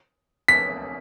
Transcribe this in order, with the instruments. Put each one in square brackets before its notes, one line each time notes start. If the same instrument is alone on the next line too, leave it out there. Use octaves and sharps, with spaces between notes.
[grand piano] B6